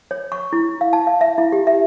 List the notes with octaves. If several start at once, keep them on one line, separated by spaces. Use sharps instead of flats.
C#5
C#6
E4
F5
A5
F5
E5
E4
G4
E5